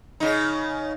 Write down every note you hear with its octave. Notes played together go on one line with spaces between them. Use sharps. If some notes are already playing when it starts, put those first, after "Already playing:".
C#3 D#4